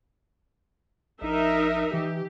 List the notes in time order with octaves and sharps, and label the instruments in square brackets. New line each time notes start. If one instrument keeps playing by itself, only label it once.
[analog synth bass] A#1 [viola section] D#4 A#4 E5
[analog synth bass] E3 [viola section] G4